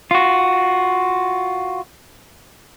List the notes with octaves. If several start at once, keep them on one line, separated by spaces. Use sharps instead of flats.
F4 F#4